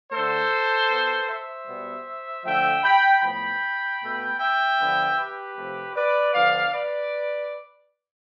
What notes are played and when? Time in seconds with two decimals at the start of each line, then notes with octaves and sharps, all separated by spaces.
0.12 D3 A3 A4 C5
0.90 B2 B3
1.29 C5 E5
1.68 B2 G3 B3
2.45 D3 F3 A3 E5 G5
2.84 G5 B5
3.23 A2 F3 B3 G5 B5
4.01 B2 A3
4.40 E5 G5
4.79 D3 F3 B3
5.18 G4 B4
5.56 C3 F3 A3
5.96 B4 D5
6.34 D3 F3 B3 D5 F5
6.73 B4 D5